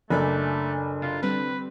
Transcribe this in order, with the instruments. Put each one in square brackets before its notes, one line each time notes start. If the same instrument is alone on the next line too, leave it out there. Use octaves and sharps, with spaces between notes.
[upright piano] F#1 [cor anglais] A3 [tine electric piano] D4 A4 [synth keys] G#5 B5 D6
[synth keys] C3 [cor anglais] F4
[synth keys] D3 G3 C4 [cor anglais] B4